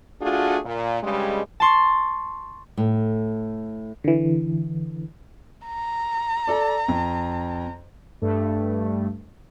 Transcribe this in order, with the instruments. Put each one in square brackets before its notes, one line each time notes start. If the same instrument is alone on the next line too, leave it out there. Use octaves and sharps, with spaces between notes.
[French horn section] A3 D4 F4 F#4 G#4
A#2
G2 C#3 G3 G#3
[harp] A5 C6 C#6
[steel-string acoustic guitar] A2
[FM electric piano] D3 E3
[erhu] A#5
[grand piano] A4 D5
F2
[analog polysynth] G2 A3